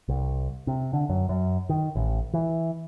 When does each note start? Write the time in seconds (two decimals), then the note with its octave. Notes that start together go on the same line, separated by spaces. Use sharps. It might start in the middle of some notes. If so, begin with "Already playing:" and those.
0.08 C2
0.67 C3
0.93 D3
1.09 F#2
1.29 F#2
1.69 D#3
1.95 A1
2.33 E3